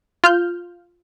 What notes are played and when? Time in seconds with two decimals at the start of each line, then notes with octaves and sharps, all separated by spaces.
0.24 F4 F6 G6